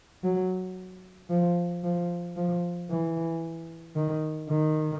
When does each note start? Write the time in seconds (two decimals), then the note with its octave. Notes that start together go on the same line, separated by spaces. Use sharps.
0.24 F#3
1.30 F3
1.84 F3
2.37 F3
2.90 E3
3.96 D#3
4.49 D#3